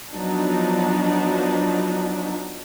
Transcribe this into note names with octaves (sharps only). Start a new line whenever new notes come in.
F3 F#3 B3 D4 D#4